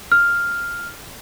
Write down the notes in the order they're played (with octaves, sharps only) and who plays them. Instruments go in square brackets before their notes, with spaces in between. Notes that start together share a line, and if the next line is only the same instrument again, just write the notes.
[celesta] F6